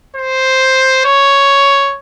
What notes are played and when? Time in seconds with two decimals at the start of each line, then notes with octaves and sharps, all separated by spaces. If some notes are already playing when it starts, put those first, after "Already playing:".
0.16 C5
1.05 C#5